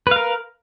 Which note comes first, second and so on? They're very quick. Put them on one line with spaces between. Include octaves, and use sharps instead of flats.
B4 F5 A#4